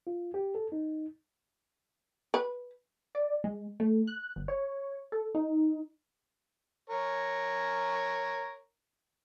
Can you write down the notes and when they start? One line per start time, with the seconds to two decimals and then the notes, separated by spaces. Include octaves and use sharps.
0.07 F4
0.34 G4
0.55 A4
0.72 D#4
2.34 B4
3.15 D5
3.44 G#3
3.80 A3
4.07 F#6
4.36 G1
4.48 C#5
5.12 A4
5.35 D#4
6.90 A#4 C#5